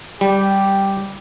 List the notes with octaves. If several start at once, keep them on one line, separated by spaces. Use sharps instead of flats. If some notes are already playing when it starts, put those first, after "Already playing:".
G3 G4